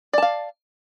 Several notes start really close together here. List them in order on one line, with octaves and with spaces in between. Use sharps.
D5 A5 F5